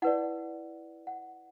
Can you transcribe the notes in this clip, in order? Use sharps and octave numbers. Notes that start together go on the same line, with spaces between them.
E4 B4 D5 F#5
F#5